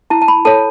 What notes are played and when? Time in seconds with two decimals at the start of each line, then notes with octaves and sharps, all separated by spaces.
0.10 E4 A5
0.22 A5
0.28 B5
0.45 A4 C#5 A5